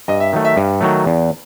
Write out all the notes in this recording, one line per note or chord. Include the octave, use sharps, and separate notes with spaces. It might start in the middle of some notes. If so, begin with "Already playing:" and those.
G2 D#5
E5
D#3 F#3 A3
E5
G2
D#3 F#3 A3
E2